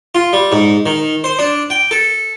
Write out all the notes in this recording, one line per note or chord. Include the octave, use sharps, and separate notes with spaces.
F4
G3
G#2
D#3
C5
D4
G5
A4